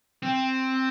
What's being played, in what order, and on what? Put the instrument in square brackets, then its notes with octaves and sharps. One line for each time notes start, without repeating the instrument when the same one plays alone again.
[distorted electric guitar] C4